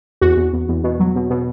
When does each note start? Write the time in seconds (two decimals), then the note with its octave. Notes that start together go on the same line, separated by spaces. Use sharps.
0.21 E2 F#4
0.37 E2
0.53 E2
0.69 E2
0.84 B2
1.00 F#3
1.16 B2
1.30 B2